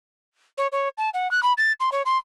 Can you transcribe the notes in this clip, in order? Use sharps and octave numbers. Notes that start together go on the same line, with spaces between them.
C#5
C#5
A5
F#5
F#6
B5
A6
C6
C#5
C6